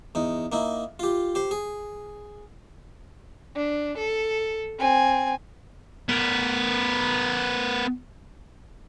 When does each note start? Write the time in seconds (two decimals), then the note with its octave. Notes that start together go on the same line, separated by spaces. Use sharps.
0.15 E2 D#4
0.52 A#3 D#4 E4
1.00 F4 G4
1.35 G4 C5
1.51 G#4
3.55 D4
3.98 A4
4.79 C4 G#5
6.09 B3 A#4